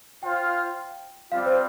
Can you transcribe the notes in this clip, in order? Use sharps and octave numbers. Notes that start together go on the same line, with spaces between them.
F4 C5 F5 G5
G3 C4 F4 F5
C5